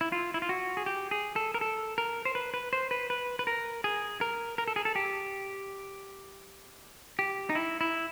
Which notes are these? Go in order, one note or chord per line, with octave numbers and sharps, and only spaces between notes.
E4
F4
E4
F4
F#4
G#4
G4
G#4
A4
A#4
A4
A#4
C5
B4
B4
C5
B4
B4
B4
A#4
G#4
A#4
A#4
A4
G#4
A4
G4
G4
D#4
E4
E4